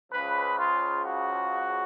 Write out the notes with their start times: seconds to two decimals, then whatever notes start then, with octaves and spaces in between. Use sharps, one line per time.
0.12 C#2 C#3 F3 B4
0.59 F4
1.06 F#4